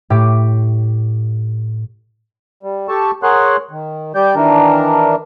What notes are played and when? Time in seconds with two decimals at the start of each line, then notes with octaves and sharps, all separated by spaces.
0.10 A2 G4 D6
2.63 G3
2.89 G4 A4 A5 C#6
3.23 G#4 A#4 C#5 F#5 C6 F#6
3.71 D#3
4.15 G3 G4 D5 G6
4.35 D#3 E3 D4 A#4